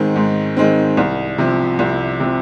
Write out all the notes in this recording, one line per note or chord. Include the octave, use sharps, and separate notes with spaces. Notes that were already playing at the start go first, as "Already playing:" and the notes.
Already playing: G#2 D#3 G#3 C4
G#2
D#3 G#3 C4
C2
C3 F3
C2
C3 F3